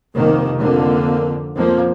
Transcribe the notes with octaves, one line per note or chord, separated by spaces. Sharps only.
F1 C2 D#3 A#3
F2 D3 A#3
F2 F3 A#3